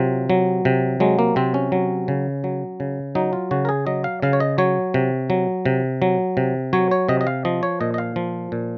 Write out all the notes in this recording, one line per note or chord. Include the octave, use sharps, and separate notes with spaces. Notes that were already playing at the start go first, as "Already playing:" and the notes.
Already playing: C3 F#3 F4
F#3
C3
F#3 G#3
A#3
C3 C4
C#4
F#3
C#3
F#3
C#3
F#3 D#4
F4
C#3 F#4
A#4
G#4
F#3 D#5
F5
C#3 F5
C#5
D#5
F#3 C#5
C3
F#3
C3
F#3
C3
F#3 C#5
C#5
C3 D#5
D#5
F5
F3 D#5
C#5
A#2 D#5
D#5
F5
F3
A#2